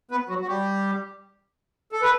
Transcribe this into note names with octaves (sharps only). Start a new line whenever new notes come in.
B3 B4
F#3 F#4
F#4
G3 G4
A4
B4